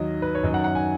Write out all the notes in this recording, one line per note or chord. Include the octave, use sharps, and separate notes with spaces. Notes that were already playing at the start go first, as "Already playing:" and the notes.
Already playing: D#2 D#3 F#3 D#5
B4
C#5
F#2 D#3 F#3 D#5
F#5
F#5
G#5